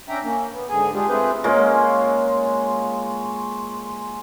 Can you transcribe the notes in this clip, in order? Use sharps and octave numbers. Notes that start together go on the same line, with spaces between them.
C#4 D4 E5 G5 A#5
A#3 C#4
B3
G#2 D3 G#4 G#5
G#3 D4 F4 G4 G#4
A3 C4 F4 G#4 B4 C5
G#3 A#3 C#4 F4